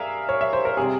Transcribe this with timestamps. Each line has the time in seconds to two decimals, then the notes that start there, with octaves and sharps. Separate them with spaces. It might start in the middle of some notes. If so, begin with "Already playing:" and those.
Already playing: G2 G#4 A#4 E5 F5
0.29 C#5
0.41 E5
0.53 C5
0.65 A#4
0.77 C3 G3 G#4